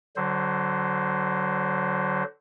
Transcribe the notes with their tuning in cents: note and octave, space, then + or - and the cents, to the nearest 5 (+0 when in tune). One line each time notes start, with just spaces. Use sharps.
D3 +0 F#3 +25 C5 +0